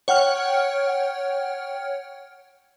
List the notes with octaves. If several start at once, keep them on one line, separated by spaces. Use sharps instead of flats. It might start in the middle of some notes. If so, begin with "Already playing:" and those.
C#5 F#5 G5 F6